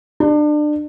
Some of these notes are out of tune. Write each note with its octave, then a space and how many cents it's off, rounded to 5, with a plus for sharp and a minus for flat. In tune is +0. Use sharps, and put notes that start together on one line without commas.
D4 +30